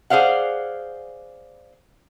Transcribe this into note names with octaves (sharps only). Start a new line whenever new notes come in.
G#4 C5 D5 F5 F#5